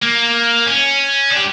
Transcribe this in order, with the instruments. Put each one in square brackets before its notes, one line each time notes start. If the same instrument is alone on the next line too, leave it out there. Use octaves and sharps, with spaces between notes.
[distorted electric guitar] A#3
C#4
D4
G4